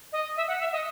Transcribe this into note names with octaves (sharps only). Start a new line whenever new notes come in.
D#5
E5
F#5
E5
D#5